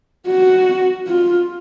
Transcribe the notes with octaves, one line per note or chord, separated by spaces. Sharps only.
F#4
F4